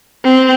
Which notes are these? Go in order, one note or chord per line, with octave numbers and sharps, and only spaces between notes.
C4